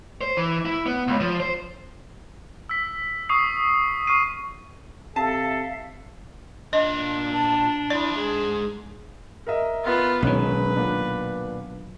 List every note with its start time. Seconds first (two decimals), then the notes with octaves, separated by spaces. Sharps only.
0.21 C5
0.37 E3
0.65 E4
0.86 B3
1.08 C#2
1.20 F3
1.40 C5
2.69 E6 B6
3.29 C#6 D#6 C7
4.07 C#6 F6 C7 D#7
5.16 C3 A4 E5 F5 A5
6.73 A#2 D4 D#5
7.33 A5
7.90 D2 F3 E4 D5
8.15 G#2 G#4
9.47 A#4 D#5 E5
9.84 B3 F4
10.22 E1 B1 D#3 C#4 B4
10.75 A#2 B3 D4